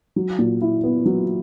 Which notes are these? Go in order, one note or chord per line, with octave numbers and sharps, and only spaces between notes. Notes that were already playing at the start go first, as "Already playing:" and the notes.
F#3
A#2
E4
B3
F#3